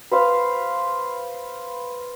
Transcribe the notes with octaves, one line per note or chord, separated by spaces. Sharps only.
B4 C5 F5